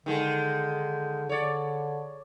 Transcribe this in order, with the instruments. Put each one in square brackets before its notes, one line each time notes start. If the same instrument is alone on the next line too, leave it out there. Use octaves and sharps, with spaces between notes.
[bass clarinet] D3 [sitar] D#3 G#3
[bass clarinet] D3 [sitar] C#5 D5